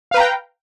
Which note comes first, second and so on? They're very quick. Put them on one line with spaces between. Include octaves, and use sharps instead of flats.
F5 B4 A#5 G5